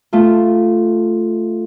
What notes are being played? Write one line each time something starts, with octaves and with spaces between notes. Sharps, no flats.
A3 F4